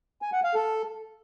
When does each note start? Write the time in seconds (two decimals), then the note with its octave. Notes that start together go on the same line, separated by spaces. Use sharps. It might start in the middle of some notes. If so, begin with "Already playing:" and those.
0.22 G#5
0.33 F#5
0.44 F5
0.55 A4